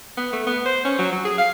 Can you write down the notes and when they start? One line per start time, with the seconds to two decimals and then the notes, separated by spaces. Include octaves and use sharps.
0.17 B3
0.33 A3
0.47 B3
0.65 C5
0.85 C#4
0.99 F#3
1.12 F#3
1.25 G#4
1.38 F5